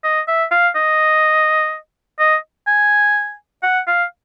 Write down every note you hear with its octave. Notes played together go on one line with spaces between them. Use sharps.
D#5
E5
F5
D#5
D#5
G#5
F#5
F5